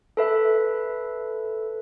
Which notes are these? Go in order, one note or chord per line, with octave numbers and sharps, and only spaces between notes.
A4 B4 E5